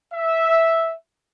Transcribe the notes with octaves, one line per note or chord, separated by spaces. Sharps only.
E5